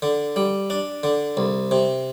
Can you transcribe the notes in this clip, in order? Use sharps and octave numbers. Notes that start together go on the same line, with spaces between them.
D3
G3
D4
D3
C2
C3